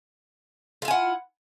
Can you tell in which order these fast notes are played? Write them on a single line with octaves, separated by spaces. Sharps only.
F4 E4 G#5 F#5